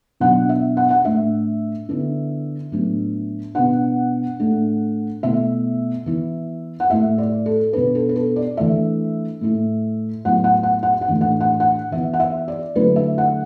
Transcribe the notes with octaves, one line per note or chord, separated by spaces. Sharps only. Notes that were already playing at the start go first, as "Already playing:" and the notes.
B2 F#3 D4 F#5
E5
F#5
F#5
A2 A3 D4 E5
D3 B3 E4
A2 F#3 B3 D4
B2 B3 D4 F#5
A2 A3 D4
B2 A3 E4 E5
E3 B3 E4
F#5
A2 A3 E4 E5
D5
A4
B2 B3 D4 B4
A4
B4
A4
D5
E3 A3 D4 E5
A2 A3 E4
A2 F#3 B3 E4 F#5
F#5
F#5
F#5
F#5
A2 E3 D4
F#5
F#5
F#5
E3 B3 E4 E5
F#5
E5
D5
D3 F#3 A3 E4 B4
E5
F#5